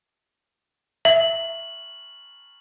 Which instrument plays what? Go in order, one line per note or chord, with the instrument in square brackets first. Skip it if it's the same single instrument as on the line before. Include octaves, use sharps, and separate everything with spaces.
[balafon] E5 [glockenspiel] F#7